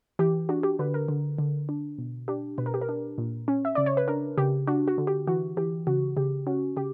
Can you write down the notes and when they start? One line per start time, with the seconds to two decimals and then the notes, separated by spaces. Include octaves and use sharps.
0.19 E3 G4
0.49 D4 F#4
0.63 G4
0.79 D3 B4
0.94 A#4
1.08 D3
1.39 D3
1.69 D4
1.98 B2
2.28 D4 G4
2.58 B2 B4
2.66 A#4
2.74 G4
2.82 A#4
2.89 D4
3.18 A#2
3.48 C#4
3.65 E5
3.75 C#3 D5
3.86 C#5
3.97 B4
4.08 D4 A#4
4.38 C#3 G4
4.67 D4 F#4
4.88 F#4
4.98 D3
5.07 G4
5.27 E3 F#4
5.57 E3 G4
5.87 C#3 F#4
6.17 C#3 G4
6.47 C#4 F#4
6.77 C#3 G4